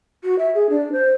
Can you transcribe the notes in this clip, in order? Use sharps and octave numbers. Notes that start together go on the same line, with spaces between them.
F#4
E5
G#4
D4
C5